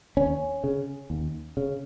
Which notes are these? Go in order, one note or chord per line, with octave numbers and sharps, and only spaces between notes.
D#2 C#4
C#3
D#2
C#3